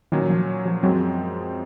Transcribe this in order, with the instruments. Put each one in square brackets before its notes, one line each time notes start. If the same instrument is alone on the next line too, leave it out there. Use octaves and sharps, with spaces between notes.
[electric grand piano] A#2 F#3 C#4 [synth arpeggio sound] D#3
[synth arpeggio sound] F3
F3
[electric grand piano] F#2 F3 G#3 C4 [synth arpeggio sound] F#3